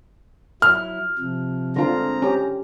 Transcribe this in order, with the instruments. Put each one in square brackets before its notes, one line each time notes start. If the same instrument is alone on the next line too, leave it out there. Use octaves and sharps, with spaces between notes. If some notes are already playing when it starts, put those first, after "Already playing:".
[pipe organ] F#3 E4 [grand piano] F6
[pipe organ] C3 F3
[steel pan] D3 F4 [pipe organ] G#3 C4 A#5
[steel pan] C#4 G4